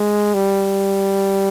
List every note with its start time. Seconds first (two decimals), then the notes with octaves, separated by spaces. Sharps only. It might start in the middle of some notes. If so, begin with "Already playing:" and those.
Already playing: G#3
0.34 G3